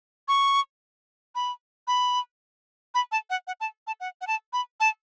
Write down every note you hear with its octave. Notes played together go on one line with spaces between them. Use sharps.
C#6
B5
B5
B5
A5
F#5
F#5
A5
A5
F#5
F#5
A5
B5
A5